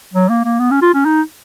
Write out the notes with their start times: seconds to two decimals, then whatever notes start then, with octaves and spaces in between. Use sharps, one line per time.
0.14 F#3
0.29 A#3
0.44 A#3
0.59 B3
0.71 C#4
0.82 F4
0.94 C#4
1.05 D#4